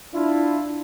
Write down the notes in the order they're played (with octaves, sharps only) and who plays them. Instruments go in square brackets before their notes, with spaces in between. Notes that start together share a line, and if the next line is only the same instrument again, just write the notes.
[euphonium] D4 [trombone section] E4 F4